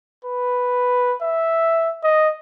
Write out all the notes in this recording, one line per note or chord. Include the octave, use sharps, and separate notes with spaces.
B4
E5
D#5